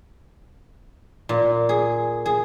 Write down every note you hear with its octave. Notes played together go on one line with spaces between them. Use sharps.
A#2
G#4
G#4